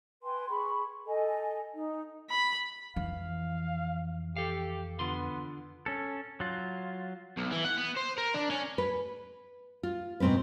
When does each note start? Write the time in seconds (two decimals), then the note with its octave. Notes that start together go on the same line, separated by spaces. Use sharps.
0.23 B4 G5 G#5 C6
0.49 G#4 B5 C#6
1.06 A4 D#5 G#5
1.74 D#4
2.30 B5
2.96 F2 E3 F5
4.37 G4 A4 F5
4.99 D3 B3 F4 C6
5.86 C#4 A4
6.40 F#3 F4
7.38 B1
7.52 E3
7.65 F#5
7.78 B3
7.97 C5
8.18 A#4
8.34 D4
8.50 C#4
8.78 B4
9.83 F4
10.20 G#2 B2 C4 C#4 B4